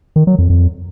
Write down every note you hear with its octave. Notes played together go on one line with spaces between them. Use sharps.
D#3
F#3
F2
F2